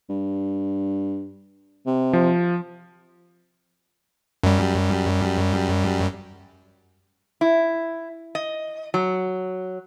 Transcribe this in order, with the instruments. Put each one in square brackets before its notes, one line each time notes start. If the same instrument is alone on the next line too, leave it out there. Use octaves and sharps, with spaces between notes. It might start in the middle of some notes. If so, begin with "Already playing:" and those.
[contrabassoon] G2
C3
[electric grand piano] F3
[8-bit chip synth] F#2 G3
[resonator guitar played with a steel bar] E4
D#5
F#3